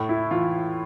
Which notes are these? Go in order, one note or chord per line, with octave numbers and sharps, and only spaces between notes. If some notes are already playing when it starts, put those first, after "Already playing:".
Already playing: A2
E4
E3 F4